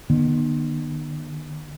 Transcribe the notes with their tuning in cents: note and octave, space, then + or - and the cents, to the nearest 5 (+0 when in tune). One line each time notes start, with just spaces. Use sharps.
D#3 -45 B3 -40